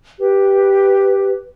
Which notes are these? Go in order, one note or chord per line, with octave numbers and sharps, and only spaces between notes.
G4 B4